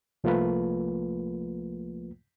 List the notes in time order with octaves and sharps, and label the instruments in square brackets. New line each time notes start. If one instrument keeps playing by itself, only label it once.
[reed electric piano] C2 F3 A3 A#3 F4 B4